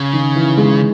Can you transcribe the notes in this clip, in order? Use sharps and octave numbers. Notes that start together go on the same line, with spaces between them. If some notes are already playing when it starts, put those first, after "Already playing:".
Already playing: C#3
D#3
E3
G#3